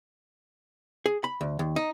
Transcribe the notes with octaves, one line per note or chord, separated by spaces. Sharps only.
G#4
B5
D2
D#2
D#4